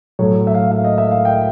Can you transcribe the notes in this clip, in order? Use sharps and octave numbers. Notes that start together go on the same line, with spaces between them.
A2 F#3 A3 C#5
E5
F5
F5
D#5
E5
F5
G5